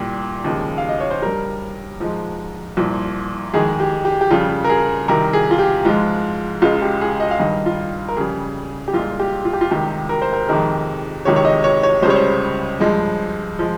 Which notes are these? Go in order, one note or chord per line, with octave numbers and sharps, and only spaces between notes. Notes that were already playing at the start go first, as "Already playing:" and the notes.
Already playing: C2 A#2 G3 G4
D#2 C#3 F3 G#3
F5
D#5
C#5
C5
G2 G3 A#4
G#2 F3 G#3
C2 A#2 F3
F2 D#3 G#3 G#4
G4
G4
G4
F2 C#3 G3 F4
A#4
G#4
C2 C3 D#3 A#4
G#4
F4
G4
G#2 F3 G#3 F4
C#2 C#3 G#3 F4
G4
G#4
D#5
F5
G2 D#3 G3 D#5
F4
A#4
F2 C#3 G3 G#4
G4
C2 A#2 G#3 F4
G4
F4
G4
F4
C#2 C3 D#3 G3 G4
A#4
C5
A#4
F2 C3 D#3 G#3 A#4
C#2 C3 D#3 G#3 C#5
C#5
D#5
C#5
C#5
C#2 C#3 G3 C5 C#5
C5
G2 F3 G#3
F3 G#3